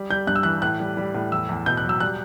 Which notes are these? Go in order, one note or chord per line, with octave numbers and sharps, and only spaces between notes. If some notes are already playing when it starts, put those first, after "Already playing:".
Already playing: G3
G3 G6
G2 F#6
E6
E3 F#6
A2 F#6
G3
G3
A2
E2 E6
E2
B2 G6
F#6
F#3
E6
G3 F#6